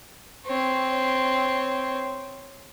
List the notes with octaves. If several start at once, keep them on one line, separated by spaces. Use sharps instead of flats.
C4 C#5